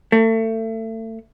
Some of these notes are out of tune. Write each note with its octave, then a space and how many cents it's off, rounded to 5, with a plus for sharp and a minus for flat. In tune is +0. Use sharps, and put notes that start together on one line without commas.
A3 +30